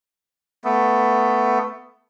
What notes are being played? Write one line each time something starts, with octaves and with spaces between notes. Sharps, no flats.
A3 B3